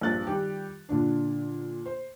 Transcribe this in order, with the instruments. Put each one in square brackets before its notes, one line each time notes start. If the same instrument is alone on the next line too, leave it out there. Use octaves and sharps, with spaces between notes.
[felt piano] A#1 G2 F#6 A6
D#3 G3 G4
A#2 D3 D4
C5